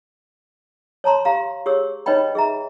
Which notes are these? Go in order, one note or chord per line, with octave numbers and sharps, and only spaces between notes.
C#5 A5 A#5 C6
G4 F5 A#5
G4 G#4 C#5 E6
D#4 B4 C#5 D#5 G5 B5
G#4 E5 A#5